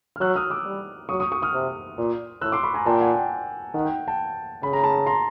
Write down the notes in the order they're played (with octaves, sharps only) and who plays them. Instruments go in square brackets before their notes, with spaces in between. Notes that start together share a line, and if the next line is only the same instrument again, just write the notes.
[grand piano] F6
[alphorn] F#3 [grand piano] E6 F#6
[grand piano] D#6 F6
D6 E6
[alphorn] G3
[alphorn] F#3 [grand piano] C#6 D#6
[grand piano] C#6 D#6
C#6 D#6
D#6 F6
[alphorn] C3
A#2
[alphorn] A2 [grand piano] E6 F#6
[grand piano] C6 D6
B5 C#6
G#5 A#5
[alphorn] A#2 [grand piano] G5 A5
[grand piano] F#5 G#5
G5
[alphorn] D#3 [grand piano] F#5
[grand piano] G5
G5 A5
[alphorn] C#3 [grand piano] B5
[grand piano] A#5
A5 B5
A#5 C6